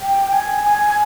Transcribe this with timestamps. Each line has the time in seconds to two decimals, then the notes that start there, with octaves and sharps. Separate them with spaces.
0.01 G5
0.32 G#5
0.63 G#5